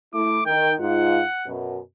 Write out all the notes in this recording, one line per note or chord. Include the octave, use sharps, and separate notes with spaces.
A3 E4 D6
D#3 G5
G#2 F4 F#5
F#2 B2